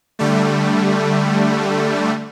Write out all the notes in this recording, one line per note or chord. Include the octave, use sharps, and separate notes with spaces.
D3 G3 A3